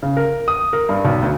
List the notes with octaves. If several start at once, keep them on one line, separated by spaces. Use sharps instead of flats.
C#3
A#4
D#6
A#4
G2
B1
D2